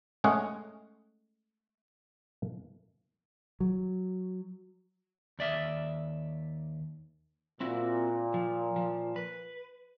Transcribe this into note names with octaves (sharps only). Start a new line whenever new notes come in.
G#3 A3 C#4 G#4 F#5
F#3
D#2 D5 E5
A#2 C4 E4 F#4
F3
F3
B4